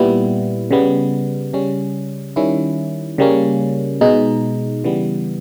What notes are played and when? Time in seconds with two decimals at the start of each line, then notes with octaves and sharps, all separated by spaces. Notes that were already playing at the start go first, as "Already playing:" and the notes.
Already playing: A#2 G3 B3 E4
0.71 C#3 G3 B3
1.53 C#3 G3 C#4
2.36 D#3 G3 C#4 E4
3.18 C#3 G3 A#3 C#4
4.01 B2 G#3 D#4
4.84 C#3 E3 G3 B3